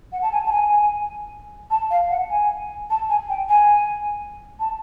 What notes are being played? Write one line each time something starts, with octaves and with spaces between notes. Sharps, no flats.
F#5
A5
G#5
A5
G#5
A5
F5
F#5
G#5
A5
G#5
G5
G#5
A5